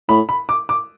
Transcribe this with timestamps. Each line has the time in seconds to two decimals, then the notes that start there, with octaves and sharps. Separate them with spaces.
0.09 A2 B5
0.29 B5
0.49 D6
0.69 D6